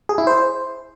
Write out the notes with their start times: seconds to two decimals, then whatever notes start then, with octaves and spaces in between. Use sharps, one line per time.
0.09 G#4
0.18 E4
0.27 C5